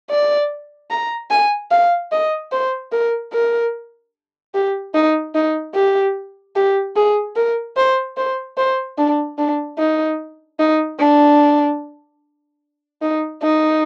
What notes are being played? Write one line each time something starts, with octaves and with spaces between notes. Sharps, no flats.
D5
A#5
G#5
F5
D#5
C5
A#4
A#4
G4
D#4
D#4
G4
G4
G#4
A#4
C5
C5
C5
D4
D4
D#4
D#4
D4
D#4
D#4